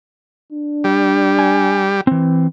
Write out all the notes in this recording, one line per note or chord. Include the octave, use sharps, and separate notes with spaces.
D4
G3
G#5
E3 C4